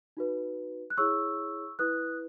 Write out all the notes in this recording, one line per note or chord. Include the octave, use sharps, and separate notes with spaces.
D#4 F#4 B4
F#6
E4 G#4 C#5 C#6 E6
E4 B4 D#6 F#6